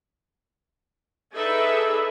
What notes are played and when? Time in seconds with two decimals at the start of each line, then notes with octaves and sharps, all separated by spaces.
1.34 D#4 G#4 A4 B4 D5 E5